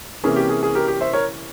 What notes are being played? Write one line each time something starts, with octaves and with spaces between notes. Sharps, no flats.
C3 E3 A#3 C#4 G#4
G4
G#4
G#4
G4 A#4
G4
C5 E5
A#4 C#5